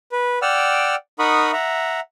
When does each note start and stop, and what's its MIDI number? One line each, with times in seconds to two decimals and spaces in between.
0.12 0.39 71
0.42 0.95 74
0.42 0.95 78
0.42 0.95 79
0.42 0.95 88
0.42 0.95 89
1.19 1.52 63
1.19 1.52 70
1.19 1.52 78
1.19 1.52 83
1.19 1.52 85
1.19 1.52 87
1.53 2.00 76
1.53 2.00 78
1.53 2.00 82